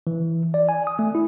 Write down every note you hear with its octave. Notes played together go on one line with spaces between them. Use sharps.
E3
D5
G#5
D#6
A3
E4